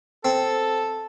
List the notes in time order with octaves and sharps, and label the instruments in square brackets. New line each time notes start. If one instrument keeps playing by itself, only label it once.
[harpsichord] C4 [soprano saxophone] A4